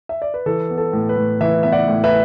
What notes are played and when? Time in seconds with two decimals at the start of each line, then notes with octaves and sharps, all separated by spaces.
0.09 E5
0.22 D5
0.34 B4
0.46 E3 A4
0.70 B3
0.78 A4
0.93 A2
1.09 B4
1.17 A2
1.41 E3 B4 E5
1.63 B3 E5
1.72 D5 F#5
1.88 A2
2.04 B4 E5